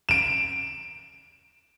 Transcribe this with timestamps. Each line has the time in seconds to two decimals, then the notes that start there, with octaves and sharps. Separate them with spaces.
0.09 D7 E7